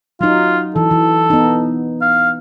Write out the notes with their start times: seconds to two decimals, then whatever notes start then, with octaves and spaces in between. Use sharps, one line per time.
0.21 F#3 D#4 F4
0.76 E3 A4
0.91 E3
1.30 B3 D#4
2.02 F5